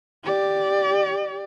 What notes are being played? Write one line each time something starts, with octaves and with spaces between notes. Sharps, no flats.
G4 D5